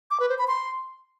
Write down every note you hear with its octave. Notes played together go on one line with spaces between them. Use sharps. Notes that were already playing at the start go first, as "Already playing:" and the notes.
D6
B4
C5
B5
C6